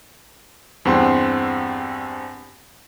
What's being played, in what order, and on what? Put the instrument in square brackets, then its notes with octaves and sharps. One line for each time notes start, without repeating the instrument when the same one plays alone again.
[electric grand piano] E2 G2 C4 F#5 G5 C6